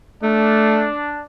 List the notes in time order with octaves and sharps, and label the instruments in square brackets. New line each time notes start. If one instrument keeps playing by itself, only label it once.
[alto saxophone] A3 [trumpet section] D4